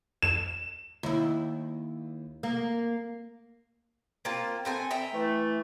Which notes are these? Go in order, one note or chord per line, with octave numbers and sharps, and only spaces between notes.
E7
D#2 E4
A#3
A#3 C4 F4
A3 C4 G#5
E5 G5 A#5
E3 A3